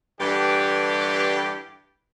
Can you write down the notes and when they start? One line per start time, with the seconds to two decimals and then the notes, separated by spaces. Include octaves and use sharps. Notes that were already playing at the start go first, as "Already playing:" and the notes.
0.19 G2 D3 E3 G4